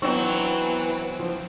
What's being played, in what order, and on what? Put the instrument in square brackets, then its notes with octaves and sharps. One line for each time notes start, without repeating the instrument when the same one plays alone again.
[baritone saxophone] E3 [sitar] F#3 C4 [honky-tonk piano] B3 C#6 [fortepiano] D4 D#4
[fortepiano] F3 C5